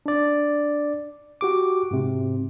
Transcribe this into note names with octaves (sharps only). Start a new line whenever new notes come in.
D4 D5
F#4 G4 D6
G#2 C3